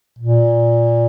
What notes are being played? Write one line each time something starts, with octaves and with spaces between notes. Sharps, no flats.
A#2